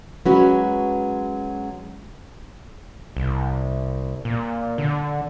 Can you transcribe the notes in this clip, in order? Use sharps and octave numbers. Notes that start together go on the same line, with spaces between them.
F#3 G#3 C#4 F#4 B4
C2
A#2
D3